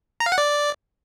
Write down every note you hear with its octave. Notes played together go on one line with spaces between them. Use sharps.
A#5
F5
F#5
D5